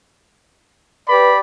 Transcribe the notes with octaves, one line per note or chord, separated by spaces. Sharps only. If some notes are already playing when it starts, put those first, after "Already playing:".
G4 B4 D5 B5